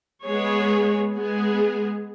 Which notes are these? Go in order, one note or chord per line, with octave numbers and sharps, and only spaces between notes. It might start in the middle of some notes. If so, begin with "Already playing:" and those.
G#3 B3 G#4 C#5
G#3 B3 G#4